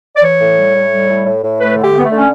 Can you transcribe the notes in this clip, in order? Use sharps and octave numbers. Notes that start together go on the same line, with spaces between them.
D5
E3 C#5
A2
G3
A2
G3
A2
A2
A2
A3 B4
D3
G4
A3
B3
A3
D3
C#4